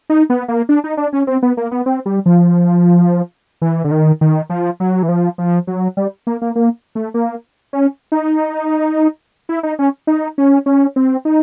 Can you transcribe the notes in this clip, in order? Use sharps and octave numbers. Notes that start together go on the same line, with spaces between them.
D#4
B3
A#3
D4
D#4
D4
C#4
C4
B3
A#3
B3
C4
G3
F3
E3
D3
D#3
D#3
F3
F#3
E3
F3
F3
F#3
G3
A#3
A#3
A#3
A3
A#3
C#4
D#4
E4
D#4
C#4
D#4
C#4
C#4
C4
D#4